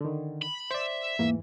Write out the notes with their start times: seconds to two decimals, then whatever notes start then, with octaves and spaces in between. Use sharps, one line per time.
0.01 D3 D#3
0.42 B5
0.71 C5 D5 E5
1.19 E2 G#2 E3 A#3